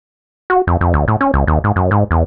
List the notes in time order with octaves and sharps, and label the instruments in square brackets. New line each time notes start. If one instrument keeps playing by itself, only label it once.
[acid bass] F#4
F2
F2
D2
A2
C#4
C#2
D#2
G#2
F#2
G#2
E2